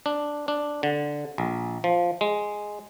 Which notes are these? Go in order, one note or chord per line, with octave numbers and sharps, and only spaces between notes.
D4
D4
D3
A#1
F3
G#3